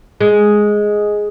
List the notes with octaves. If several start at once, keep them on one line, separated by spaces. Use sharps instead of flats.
G#3